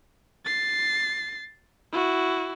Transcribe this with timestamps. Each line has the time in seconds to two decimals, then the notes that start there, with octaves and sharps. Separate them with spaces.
0.45 A6 C7
1.92 E4 F#4